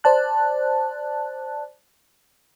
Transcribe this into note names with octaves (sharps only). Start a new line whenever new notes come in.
C5 D5 A5 F#6